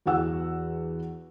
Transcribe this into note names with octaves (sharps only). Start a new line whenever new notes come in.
E2 E3 F#4 F#5 E6